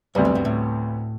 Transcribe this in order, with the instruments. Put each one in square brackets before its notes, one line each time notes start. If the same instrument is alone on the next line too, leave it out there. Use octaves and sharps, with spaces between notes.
[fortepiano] D2 C3 G3 B3 [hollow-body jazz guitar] G2
[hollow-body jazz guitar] F#2
G2
A2